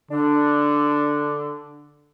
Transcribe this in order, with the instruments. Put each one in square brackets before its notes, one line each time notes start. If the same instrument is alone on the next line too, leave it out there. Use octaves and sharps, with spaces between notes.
[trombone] D3 [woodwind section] D4